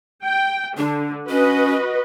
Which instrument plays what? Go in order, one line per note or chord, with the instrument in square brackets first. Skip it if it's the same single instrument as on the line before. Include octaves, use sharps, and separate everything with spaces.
[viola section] G5
[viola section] D3 [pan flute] D4
[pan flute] C#4 [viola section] F#4 B4 D#5